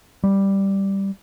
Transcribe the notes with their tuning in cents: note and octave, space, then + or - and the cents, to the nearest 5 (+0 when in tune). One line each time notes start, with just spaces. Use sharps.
G3 +0